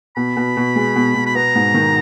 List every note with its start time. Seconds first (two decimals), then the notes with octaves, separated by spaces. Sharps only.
0.16 B2 B5
0.37 B2
0.57 B2
0.76 G#3
0.96 B2
1.15 B2
1.26 B5
1.35 B3 A#5
1.55 G#2
1.74 D#3